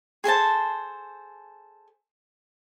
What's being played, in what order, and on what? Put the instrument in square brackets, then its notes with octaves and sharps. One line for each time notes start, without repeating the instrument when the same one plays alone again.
[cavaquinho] G#4 A4 C5 A5